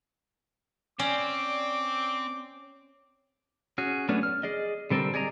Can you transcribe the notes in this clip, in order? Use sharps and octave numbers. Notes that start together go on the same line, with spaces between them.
C4 C#4 D5 D6
C#4 F#4 G#4
F#3 A3 B3 C#4 D4
F6
G#4 D5 D#5
D3 G3 C4 A4 A#4
G#4 D5 D#5 A#5